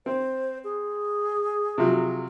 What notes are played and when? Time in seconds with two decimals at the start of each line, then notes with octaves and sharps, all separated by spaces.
0.06 C4 C5
0.64 G#4
1.78 C3 F3 F#3